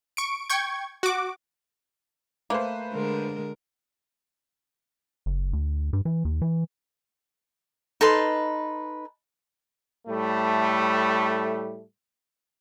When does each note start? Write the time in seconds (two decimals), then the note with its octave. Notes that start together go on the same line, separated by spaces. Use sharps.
0.17 C#6 D7
0.50 G5 C#6 G#6
1.03 F#4 D6
2.50 A3 A#3 B4 C5
2.92 D3 G#3 A#4
5.26 F#1
5.53 D2
5.93 G2
6.05 E3
6.25 D#2
6.42 E3
8.01 D#4 A4 B4 C6
10.07 A2 G3 A3